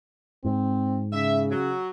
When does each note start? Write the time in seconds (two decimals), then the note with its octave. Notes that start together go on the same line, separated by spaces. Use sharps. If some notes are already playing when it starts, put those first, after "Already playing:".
0.44 G#2 C4
1.13 C#3 E5
1.51 F#3